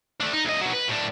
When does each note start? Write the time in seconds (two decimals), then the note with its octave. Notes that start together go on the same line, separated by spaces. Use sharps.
0.20 A3 D4
0.33 D#4
0.45 D2 D#5
0.61 B2 F#3
0.73 B4
0.88 A2 D4